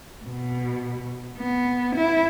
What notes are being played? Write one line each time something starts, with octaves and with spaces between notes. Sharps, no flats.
B2
B3
E4